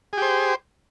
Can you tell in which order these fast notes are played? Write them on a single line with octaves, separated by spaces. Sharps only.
G#4 G4 C5